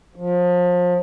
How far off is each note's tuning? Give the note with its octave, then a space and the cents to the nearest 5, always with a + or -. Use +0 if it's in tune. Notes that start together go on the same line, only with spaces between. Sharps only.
F3 +30